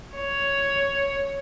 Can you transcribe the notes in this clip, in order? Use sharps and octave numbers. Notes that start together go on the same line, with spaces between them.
C#5